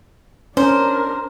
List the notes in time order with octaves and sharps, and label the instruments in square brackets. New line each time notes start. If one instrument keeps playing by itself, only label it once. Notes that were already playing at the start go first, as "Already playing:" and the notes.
[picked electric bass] C#4 [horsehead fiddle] D4 A#4 [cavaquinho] C5